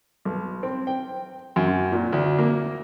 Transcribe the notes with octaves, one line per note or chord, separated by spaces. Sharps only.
B1
C4
G5
F#2
A#2
D2
A#3